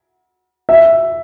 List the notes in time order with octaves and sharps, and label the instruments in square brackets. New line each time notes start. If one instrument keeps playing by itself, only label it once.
[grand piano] E5